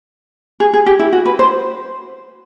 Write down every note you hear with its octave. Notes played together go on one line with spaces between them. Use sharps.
G#4
G#4
G4
E4
F#4
B4
C5